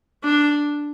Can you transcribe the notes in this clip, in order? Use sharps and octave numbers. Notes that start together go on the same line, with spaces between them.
D4